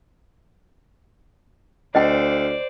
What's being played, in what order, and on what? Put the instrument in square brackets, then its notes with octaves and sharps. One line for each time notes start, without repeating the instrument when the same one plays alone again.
[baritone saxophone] D2 [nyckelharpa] C5 D5 [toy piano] D#5 G5